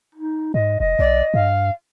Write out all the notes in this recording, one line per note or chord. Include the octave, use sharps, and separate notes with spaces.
D#4
G#2 D#5
F1 D#5
B1 D5
G2 F5